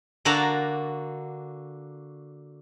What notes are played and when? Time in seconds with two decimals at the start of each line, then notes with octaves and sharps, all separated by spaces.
0.25 D3 A#3 F#4 D5 A5 A#5